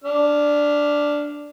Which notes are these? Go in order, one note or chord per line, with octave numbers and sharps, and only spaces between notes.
D4 F6